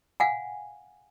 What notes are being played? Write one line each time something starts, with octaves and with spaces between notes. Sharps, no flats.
F5 F#5 G#5